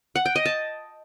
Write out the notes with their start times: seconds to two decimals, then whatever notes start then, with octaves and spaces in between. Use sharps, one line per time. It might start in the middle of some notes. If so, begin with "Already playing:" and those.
0.15 F#5
0.25 G5
0.35 D#5
0.45 A5